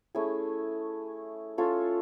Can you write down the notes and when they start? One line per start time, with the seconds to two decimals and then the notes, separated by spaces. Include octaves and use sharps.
0.15 A3 C#4 E4 G#4
1.58 C#4 F4 A4 C#5